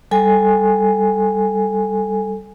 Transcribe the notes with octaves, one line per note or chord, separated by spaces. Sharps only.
G3 A4 G#5